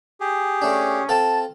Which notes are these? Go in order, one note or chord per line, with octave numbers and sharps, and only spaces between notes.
G4 G#4
A3 C#4 D4
C4 F4 A4 A5